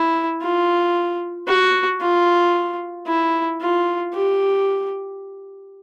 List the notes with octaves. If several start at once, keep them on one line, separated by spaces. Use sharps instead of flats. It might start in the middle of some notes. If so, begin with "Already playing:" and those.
Already playing: E4
F4
F#4
F4
E4
F4
G4